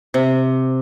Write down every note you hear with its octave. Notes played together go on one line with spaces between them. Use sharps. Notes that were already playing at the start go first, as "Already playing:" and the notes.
C3